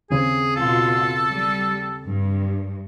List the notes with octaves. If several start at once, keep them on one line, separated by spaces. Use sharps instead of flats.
D#2 C#3 C4 G#4
B2 F4 A4
G3
G2